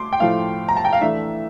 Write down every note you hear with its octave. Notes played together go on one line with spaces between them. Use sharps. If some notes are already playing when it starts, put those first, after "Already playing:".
Already playing: A3 C6 D6
G5
A2 F3 A3 F5
A#5
A5
G5
F5
E3 A3 D4 E5